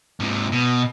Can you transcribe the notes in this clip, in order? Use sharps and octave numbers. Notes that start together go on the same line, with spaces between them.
G#2 C3
B2